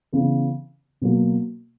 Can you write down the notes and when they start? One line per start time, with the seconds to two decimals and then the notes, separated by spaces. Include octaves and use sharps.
0.13 C#3 E3 B3
1.01 B2 F#3 A#3